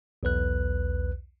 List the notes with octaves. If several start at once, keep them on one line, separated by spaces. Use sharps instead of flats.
B1 E2 B4 F#6